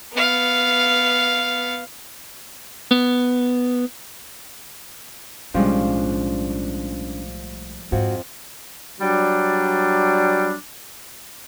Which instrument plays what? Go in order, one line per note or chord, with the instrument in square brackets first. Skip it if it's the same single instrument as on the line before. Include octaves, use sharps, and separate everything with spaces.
[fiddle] B3 F5
[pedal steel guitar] B3
[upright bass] B1 A2 [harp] F3 G3 G#3 [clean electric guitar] C#4 D4
[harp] F2 [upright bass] G#2 [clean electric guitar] F#4
[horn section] F#3 G3 D4